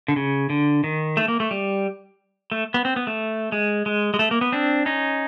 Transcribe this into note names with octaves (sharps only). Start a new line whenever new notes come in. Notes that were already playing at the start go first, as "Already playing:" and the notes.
D3
C#3
D3
D#3
A3
A#3
A3
G3
A3
B3
C4
B3
A3
G#3
G#3
G#3
A3
A#3
B3
C4 D4
C#4 D#4